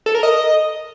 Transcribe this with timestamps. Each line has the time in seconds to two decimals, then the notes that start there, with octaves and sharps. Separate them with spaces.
0.06 A4
0.15 A#4
0.23 D#5